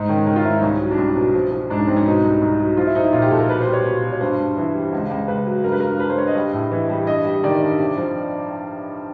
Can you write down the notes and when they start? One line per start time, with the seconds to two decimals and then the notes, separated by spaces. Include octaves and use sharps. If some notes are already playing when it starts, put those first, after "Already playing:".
Already playing: G#2 D#4
0.09 D#3 C#4
0.26 D#3 C#4
0.36 F4
0.44 G#2 E4
0.53 D#4
0.62 C2 C#4
0.80 F#3
0.91 D4
0.98 C2 C#4
1.16 B2
1.34 F3
1.52 F3
1.70 G#2 D4
1.78 C#4
1.87 G#2 C4
1.96 C#4
2.06 B2 D#4
2.24 C2
2.42 C2
2.59 F#3
2.77 F3 F4
2.87 E4
2.95 F3 D#4
3.04 E4
3.13 A#2 F4
3.22 G4
3.31 A#2 A4
3.40 A#4
3.49 B2 B4
3.61 C5
3.67 G3
3.73 C#5
3.85 B2
4.02 B2
4.12 C#5
4.21 G2 C5
4.39 G2
4.57 E3
4.75 G3
4.93 C#2
5.10 C#2
5.28 C#2 B4
5.46 F#3
5.64 G2 A#4
5.72 B4
5.80 G2 A#4
5.99 G2 B4
6.10 C5
6.18 G2 C#5
6.27 D#5
6.35 G3
6.53 A2
6.71 E3
6.90 G3
7.07 G2 D#5
7.25 G3
7.43 D#3 D5
7.62 G2
7.79 C3
7.97 F3